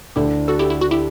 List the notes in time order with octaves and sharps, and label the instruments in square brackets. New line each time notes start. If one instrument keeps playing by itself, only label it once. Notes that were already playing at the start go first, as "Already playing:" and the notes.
[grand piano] D2 D3 A3 D4 [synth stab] E4 G4
[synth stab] F#4 A4
E4 G4
E4
F#4
E4 G4